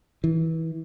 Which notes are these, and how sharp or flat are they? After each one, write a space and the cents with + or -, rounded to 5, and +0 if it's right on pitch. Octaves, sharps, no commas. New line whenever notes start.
E3 -25